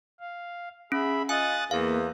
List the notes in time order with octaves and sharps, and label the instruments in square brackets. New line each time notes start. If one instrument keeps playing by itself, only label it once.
[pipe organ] F5
[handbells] C#4 [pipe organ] G#4 E5 B5
[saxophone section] F4 D#5 [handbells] G#5 [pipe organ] D#6 F#6 A6
[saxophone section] E2 [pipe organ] A#3 [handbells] F5